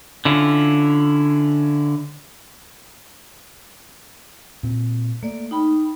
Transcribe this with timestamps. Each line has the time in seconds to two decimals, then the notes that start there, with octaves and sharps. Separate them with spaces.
0.25 D3 C#4 E4 F4
4.63 A#2 C4
5.23 A3 A#3 D5
5.51 D#4 G5 B5